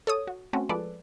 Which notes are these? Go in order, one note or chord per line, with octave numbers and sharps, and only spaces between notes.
A4 C#5 D#6
F#4
A3 C4 C#4 F#4
F3 G#3 A4 B4 D5